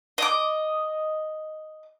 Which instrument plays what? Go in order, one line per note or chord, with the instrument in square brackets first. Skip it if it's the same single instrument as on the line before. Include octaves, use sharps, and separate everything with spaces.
[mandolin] D#5 D6